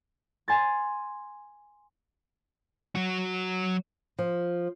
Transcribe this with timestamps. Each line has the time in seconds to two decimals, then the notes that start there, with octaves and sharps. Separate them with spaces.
0.48 G#5 C6 A6
2.95 F#3 F#4
4.19 F3